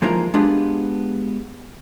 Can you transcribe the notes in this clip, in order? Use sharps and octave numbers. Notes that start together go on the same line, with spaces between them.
E3 F3 G#3 A#3 D#4 A#4
G#3 B3 D4 F4 G4 G#4